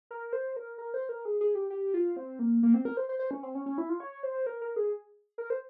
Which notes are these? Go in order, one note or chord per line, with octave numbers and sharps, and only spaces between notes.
A#4
C5
A#4
A#4
C5
A#4
G#4
G#4
G4
G4
F4
C4
A#3
A#3
C4
A#4
C5
C5
C5
C#4
C4
C#4
C#4
E4
F4
C#5
C5
A#4
A#4
G#4
A#4
C5